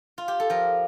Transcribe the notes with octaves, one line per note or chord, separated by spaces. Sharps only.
F4
G4
A4
F3 A#4